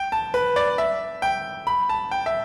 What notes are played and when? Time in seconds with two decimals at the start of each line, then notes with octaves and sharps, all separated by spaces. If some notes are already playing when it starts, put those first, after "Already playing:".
Already playing: G5
0.12 A5
0.34 B4
0.56 D5
0.78 E5
1.22 G5
1.67 B5
1.89 A5
2.11 G5
2.26 E5